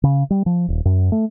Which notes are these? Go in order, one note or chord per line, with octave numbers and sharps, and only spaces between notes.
C#3
G3
F3
D#1
F#2
A3